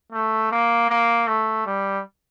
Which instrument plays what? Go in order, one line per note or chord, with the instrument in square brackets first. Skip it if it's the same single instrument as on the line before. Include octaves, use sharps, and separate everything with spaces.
[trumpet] A3
A#3
A#3
A3
G3